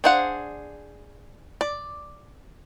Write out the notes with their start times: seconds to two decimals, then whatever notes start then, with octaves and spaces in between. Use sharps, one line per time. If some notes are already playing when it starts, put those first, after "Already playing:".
0.04 D4 G#4 C5 F5 F#5
1.61 D5